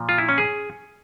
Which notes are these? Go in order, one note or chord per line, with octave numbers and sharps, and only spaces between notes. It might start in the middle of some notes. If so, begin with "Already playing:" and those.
Already playing: A#2 F3
F4
E4
C#4
G#4